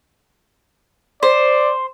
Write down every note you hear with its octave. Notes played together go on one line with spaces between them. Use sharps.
C5 D5